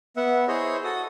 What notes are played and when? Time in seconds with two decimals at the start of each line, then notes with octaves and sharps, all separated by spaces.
0.17 B3 E5 F#5
0.48 E4 G#4 C5 C#5 D#5
0.84 F#4 A4 D#6